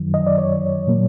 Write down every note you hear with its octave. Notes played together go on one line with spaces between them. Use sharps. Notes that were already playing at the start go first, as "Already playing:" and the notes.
Already playing: F#2 D#3 F#3
D#5
D5
C#5
A#2 F#3 A#3